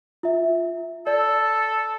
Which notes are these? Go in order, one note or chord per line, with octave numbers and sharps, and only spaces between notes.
F4 E5
A4 D5